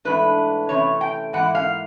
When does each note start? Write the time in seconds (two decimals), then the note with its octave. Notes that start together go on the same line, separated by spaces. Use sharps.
0.05 G#2 E3 A3 D4 B4
0.69 C3 E3 A3 C#4 C#5
1.01 G5
1.33 G#2 E3 A#3 F#5
1.55 F5